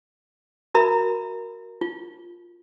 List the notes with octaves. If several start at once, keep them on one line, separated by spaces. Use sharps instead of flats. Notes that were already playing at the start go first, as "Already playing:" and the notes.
F#4 A#4 E5 A#5 B5
F4